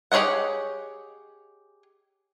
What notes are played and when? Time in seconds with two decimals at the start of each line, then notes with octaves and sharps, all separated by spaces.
0.12 G4 G#4 C#5 D#5 F#5